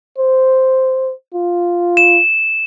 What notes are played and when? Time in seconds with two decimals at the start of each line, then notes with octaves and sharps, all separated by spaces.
0.18 C5
1.34 F4
1.97 E7